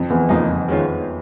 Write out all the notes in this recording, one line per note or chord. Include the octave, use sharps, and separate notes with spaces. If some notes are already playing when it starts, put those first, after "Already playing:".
Already playing: F2
E2
F2 C#3 F3 A#3 D#4
D#3 G#3 C#4 F4